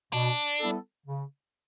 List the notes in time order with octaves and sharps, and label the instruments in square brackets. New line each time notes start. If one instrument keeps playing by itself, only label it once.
[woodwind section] B2 [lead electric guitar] D4
[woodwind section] G3 B3 E4 A4
C#3